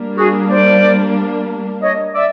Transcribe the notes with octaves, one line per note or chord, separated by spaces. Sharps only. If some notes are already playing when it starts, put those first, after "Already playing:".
Already playing: G3 A#3 D4
F#4 G#4
C5 D5
C#5 D#5
D5 E5